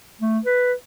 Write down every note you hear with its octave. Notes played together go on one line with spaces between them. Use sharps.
A3
B4